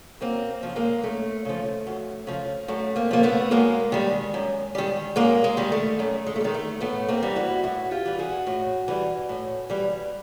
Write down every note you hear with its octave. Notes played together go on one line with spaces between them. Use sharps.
F#2 A#3 C4
C#3 F3
G#3 A#3
F#2 A3
C#3 F3
F#2
C#3 F3
F#2 A3
A#3 C4
C#3 F3 A#3
A3 B3
F#2 G#3 A#3
D#3 G3
F#2
D#3 G3
F#2 G#3 A#3
G#3
D#3 G3
A3
F#2 A3
G#3
A3
G3
D#3 G#3
A3
A2 A3 B3
A#3 C4
E3 G3
E4 F#4
A2 E4 F#4
F4 G4
E3 G3
F#4 G#4
A2
E3 G3
A2
E3 G3